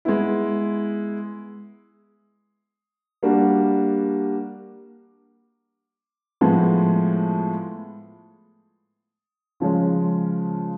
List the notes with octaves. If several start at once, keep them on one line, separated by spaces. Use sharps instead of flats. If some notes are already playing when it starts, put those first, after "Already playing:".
G#3 B3 E4
G3 A#3 D4 F#4
A2 F3 G#3 B3
C#3 F3 G#3 C#4